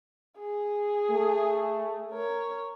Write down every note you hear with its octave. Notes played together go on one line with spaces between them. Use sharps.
G#4
A3
A#4 C#5